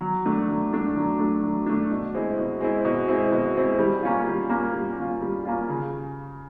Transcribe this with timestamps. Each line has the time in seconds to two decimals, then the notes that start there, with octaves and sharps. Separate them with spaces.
0.01 F#3
0.25 A3 D4
0.48 F#3
0.73 A3 D4
0.95 F#3
1.19 A3 D4
1.43 F#3
1.66 A3 D4
1.90 B2
2.14 G#3 C4 E4
2.38 B2
2.61 G#3 C4 E4
2.85 B2
3.08 G#3 C4 E4
3.32 B2
3.56 G#3 C4 E4
3.79 G3
4.03 A#3 C#4 F4
4.27 G3
4.50 A#3 C#4 F4
4.73 G3
4.97 A#3 C#4 F4
5.21 G3
5.45 A#3 C#4 F4
5.69 C#3